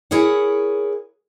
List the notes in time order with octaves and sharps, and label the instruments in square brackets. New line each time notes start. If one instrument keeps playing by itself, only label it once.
[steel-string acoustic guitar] E4 G#4 A#4 C#5 F#5